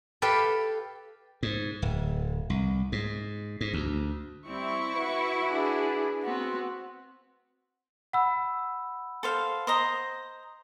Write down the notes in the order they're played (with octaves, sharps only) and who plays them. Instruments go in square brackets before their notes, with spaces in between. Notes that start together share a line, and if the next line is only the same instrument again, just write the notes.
[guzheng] G4 A4 B4 F5 G5
[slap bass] G#2
D1
C2
G#2
G#2
D2
[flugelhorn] G3 [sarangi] C4 [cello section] E4 [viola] C#6
[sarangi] F#4 [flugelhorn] B4
[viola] D4 G#4
[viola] B3 C4 [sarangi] F#4
[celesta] F#5 B5 E6
[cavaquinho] A4 C5 F5
C5 D#5 A#5